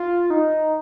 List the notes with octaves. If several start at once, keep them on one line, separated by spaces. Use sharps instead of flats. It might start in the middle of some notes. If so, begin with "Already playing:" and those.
Already playing: F4
D#4